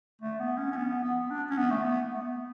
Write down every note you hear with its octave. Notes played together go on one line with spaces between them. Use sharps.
A3
B3
C#4
C#4
B3
B3
D4
C#4
B3
A3
B3
A3
B3